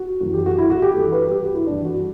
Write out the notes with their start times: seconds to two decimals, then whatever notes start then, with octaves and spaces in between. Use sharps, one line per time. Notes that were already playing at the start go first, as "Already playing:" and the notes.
Already playing: F#4
0.21 F#2 E3
0.34 G4
0.46 F#4
0.58 E4
0.70 F#4
0.82 G4
0.94 G2 E3 A4
1.12 B4
1.31 G4
1.43 F#4
1.55 E4
1.67 G2 E3 D4
1.85 F#4